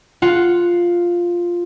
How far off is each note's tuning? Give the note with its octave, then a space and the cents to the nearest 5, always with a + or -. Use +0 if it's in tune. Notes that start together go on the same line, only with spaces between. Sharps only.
F4 +0 F#5 +0